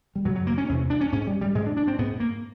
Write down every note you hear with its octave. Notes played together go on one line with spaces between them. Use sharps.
G3
F#2 C#3 F#3
F#3
A#3
C#4
E2 C3 C#4
D4
C#4
G#2 C#4
G3
G3
G#2 G#3
D4
D4
C4
G#2 B3
A#3